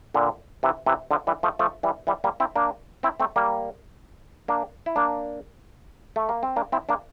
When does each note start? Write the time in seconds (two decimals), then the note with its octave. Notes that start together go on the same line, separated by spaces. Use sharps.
0.14 A#2 D3
0.63 C3 E3
0.86 C3 E3
1.11 D3 F3
1.27 E3 G3
1.43 F3 A3
1.59 F3 A3
1.83 E3 G3
2.07 E3 G3
2.24 G3 A#3
2.40 C4 E4
2.56 A#3 D4
3.03 C4 E4
3.20 A3 C4
3.36 G3 A#3
4.48 A#3 D4
4.86 E4
4.96 A#3 D4
6.16 A3
6.29 A#3
6.43 C4
6.56 A#3 D4
6.72 C4 E4
6.89 A#3 D4